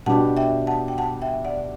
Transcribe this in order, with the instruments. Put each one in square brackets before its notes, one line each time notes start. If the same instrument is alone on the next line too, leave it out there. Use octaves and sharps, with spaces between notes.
[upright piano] B2 G3 D4 G4 [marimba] F#5 A5
[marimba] E5 G5
F#5 A5
G5
F#5 A5
E5 G5
D5 F#5